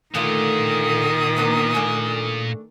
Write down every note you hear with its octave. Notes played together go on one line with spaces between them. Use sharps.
A#2 D3 D#3 A3 F4 D#6
A#3 B3 D4
A3 D4 G#4